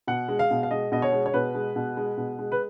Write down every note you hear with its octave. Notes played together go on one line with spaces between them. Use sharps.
B2 F#5
G#3
F5
B2
F5
G#3 D#5
B2 D#5
C#5
G#3
C#5
B2 B4
G#3
B2
G#3
B2
G#3
B4